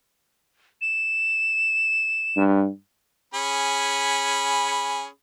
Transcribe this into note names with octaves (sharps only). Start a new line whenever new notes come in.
E7
G2
C#4 G#4 B5